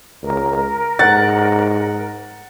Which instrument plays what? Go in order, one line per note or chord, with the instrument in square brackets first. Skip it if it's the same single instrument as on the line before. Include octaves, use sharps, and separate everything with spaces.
[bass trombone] C#2 [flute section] A#4
[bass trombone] G#2 [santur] F#5 [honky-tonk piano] A6